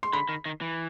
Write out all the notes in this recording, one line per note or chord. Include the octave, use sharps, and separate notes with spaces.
C6
D3 B5
D#3
D#3
E3